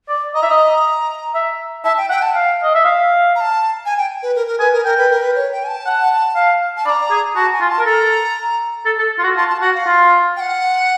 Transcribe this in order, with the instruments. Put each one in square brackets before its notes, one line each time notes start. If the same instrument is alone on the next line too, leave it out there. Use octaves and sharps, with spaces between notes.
[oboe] D5
[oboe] D#5 [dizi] A#5
[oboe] E5
D#5
E5
[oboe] E5 [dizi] A5
[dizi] G5
[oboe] F#5 [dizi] G5
[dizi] A5
[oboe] F5
D#5
E5
F5
[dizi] A#5
A5
G#5
G5
B4
A#4
A#4
[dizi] B4 [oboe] G#5
[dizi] A#4
[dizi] A#4 [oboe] G5
[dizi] B4
A#4
B4
C#5
G5
G#5
A5
[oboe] F#5
F5
[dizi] A5
[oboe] D5 [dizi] B5
[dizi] A#5
[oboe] G#4
[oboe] F#4 [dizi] A5
[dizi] G#5
[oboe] F4
[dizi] A5
[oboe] A#4
[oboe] A4 [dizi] A#5
[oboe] A4
A4
F4
F#4
[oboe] F4 [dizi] A5
[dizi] A5
[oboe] F#4 [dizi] F#5
[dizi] F5
[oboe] F4
[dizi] G5
F#5